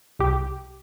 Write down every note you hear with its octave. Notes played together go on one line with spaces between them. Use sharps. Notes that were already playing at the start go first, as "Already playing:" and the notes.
C2 G4